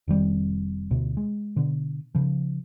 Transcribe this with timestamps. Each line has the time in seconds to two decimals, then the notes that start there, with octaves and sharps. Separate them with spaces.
0.08 F1 D#3 G3 C4
0.91 D2 B2
1.17 G#3
1.56 B2 D3
2.15 C#3 F3